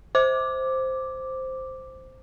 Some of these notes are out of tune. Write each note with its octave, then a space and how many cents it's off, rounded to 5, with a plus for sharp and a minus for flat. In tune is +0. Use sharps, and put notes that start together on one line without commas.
C5 +0 D6 +0